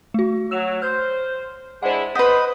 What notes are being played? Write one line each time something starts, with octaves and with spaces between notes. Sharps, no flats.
A3 F#4
F#3 E6 E7 F7
C5 F6 G6
G#3 D4 E4 C5 F#5
B4 C5 D#5 F#5 B6